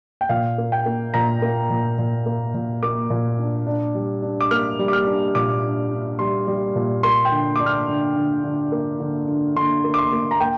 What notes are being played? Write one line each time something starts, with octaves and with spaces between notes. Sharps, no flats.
G5
A#2 F5
A#3
G5
A#3
A#2 A#5
A#3
A#2
A#2
A#3
A#2
A#3 D6
A#2
D4
D4
G3
D4
D6
A#3 F6
G3
D6
F6
D4
A#2 D6
D4
D4
G3 C6
G3
A#2
A#3 C6
G5
D3
D4 D6
F6
D3
D3
D3
A#3
D3
D3
D3 C6
A#3
D6
C6
A#3
A#5
A#3 G5